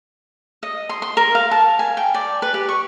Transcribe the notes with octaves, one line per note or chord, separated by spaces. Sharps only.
D#5
C6
C6
A#4
F5
A5
G#5
G5
D5
B4
G4
C#6